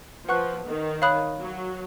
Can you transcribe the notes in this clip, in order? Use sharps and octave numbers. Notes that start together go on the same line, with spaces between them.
F3 B4 F#5 C#6 F#6
D#3
C#5 F5 B5 D#6 F#6
F#3